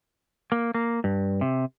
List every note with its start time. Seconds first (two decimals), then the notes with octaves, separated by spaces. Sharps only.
0.52 A#3
0.74 A#3
1.04 G2
1.41 C3